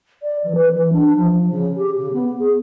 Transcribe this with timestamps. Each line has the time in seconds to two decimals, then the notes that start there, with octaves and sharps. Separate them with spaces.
0.22 D5
0.44 E3
0.55 B4
0.71 E3
0.93 D4
1.15 F3
1.50 C#3
1.76 G4
1.98 C#3
2.13 B3
2.39 G#4